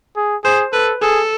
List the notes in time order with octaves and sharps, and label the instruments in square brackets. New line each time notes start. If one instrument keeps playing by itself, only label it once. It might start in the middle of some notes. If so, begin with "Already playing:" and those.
[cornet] G#4
[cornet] G#4 [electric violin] C5
[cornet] A4 [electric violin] B4
[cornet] G#4 [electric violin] A4